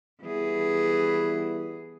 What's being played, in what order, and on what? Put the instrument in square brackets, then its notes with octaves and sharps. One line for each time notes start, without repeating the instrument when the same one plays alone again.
[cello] E3 G#4 [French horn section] G3 B3 E4